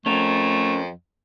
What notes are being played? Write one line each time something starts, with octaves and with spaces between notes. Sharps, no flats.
F2 A3 C#4 A#4